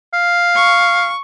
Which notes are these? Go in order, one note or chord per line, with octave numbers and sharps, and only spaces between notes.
F5
C#6